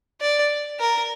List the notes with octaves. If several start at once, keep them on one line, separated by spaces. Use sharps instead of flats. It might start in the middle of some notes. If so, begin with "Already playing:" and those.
D5
A#4